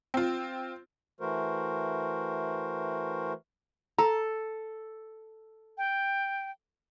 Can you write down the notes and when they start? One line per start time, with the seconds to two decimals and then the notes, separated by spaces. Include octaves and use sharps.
0.14 C4 F4
1.20 E3 A3 F#4 A#4 C5
3.98 A4 A#5
5.78 G5